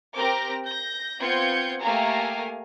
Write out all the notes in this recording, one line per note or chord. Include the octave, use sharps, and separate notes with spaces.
C4 G4 A#4 D6 G6 A#6
G6 A#6
B3 C4 F4 G6 G#6 C#7
A3 A#3 G4 F5 G#5 A#5